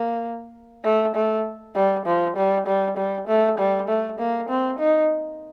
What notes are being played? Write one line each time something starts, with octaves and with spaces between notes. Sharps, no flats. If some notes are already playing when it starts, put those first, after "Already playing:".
Already playing: A#3
A3
A3
G3
F3
G3
G3
G3
A3
G3
A3
A#3
C4
D#4